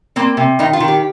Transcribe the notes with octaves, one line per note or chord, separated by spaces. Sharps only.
A#3 C4
C3
D#3 D#4
F4
D#3
G4